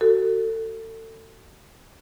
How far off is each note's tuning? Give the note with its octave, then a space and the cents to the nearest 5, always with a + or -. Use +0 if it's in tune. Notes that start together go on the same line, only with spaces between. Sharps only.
F#4 +30 A4 +35